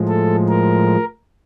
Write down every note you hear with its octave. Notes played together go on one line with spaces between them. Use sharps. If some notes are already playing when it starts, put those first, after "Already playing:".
Already playing: A2 F3 G#3
A4
A#4